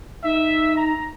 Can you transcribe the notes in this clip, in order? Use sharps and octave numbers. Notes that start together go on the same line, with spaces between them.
D#4 E5
A#5